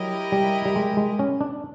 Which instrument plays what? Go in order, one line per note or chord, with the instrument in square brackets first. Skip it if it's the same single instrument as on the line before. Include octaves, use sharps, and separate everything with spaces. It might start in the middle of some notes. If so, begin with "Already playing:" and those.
Already playing: [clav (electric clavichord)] F#3 [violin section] E4 G4 A#4 D#5
[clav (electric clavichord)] G3
G3
G#3
G#3
C#4
D4